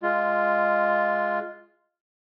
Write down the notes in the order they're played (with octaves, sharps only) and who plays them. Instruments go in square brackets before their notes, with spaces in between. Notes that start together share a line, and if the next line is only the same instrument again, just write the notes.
[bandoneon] G#3 F4